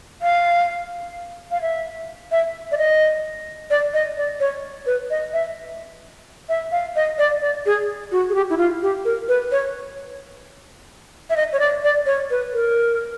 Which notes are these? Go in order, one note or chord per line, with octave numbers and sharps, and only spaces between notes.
F5
F5
E5
E5
D5
D#5
D5
D#5
D5
C#5
B4
D#5
E5
E5
F5
D#5
D5
D5
G#4
F#4
G#4
G4
E4
F4
G4
A#4
B4
C#5
E5
D#5
C#5
D5
D5
C#5
B4
A#4